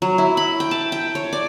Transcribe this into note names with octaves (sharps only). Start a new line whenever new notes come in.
F#3
E4
B5
G5
A5
G5
C#5
D5